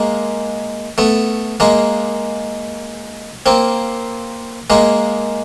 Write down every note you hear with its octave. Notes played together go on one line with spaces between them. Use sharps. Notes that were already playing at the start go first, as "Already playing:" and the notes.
Already playing: G#3 A#3
A3 B3
G#3 A#3
A#3 C4
G#3 A#3